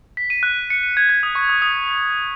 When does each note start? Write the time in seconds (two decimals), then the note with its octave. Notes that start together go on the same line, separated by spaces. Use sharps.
0.17 B6
0.30 D#7
0.43 F#6
0.70 C#7
0.83 D#7
0.97 G#6
1.09 G#6
1.23 D#6
1.35 C#6
1.49 D#6
1.62 D#6